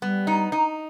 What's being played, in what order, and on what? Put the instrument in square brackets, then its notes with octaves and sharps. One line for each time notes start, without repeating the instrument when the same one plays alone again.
[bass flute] G3 [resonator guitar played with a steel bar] B3
[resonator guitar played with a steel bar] D#4
D#4